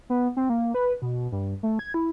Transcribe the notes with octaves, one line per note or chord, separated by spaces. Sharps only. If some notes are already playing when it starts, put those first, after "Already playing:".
B3
C4
A#3
B4
B2
G2
A3
G#6
E4